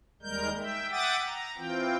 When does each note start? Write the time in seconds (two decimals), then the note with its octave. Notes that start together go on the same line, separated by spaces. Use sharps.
0.22 D#2 G3 G#3 A#4 G6
0.59 E5 G5
0.91 E5 F#5 G5 D6 D#6 A6
1.26 A#5
1.58 E3 C4 F4 G5